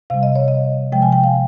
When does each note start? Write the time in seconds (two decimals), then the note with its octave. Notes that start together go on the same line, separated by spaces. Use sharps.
0.10 C3 G3 F5
0.23 D#5
0.36 C#5
0.48 D#5
0.92 C3 F3 G#3 G5
1.02 G#5
1.12 G5
1.24 F5